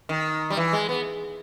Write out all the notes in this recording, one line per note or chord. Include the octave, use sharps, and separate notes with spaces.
D#3
G3
E3
G#3
B3